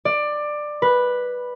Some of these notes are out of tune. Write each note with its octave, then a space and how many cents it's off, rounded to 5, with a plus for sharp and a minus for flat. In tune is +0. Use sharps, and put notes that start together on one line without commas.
D5 +15
B4 -5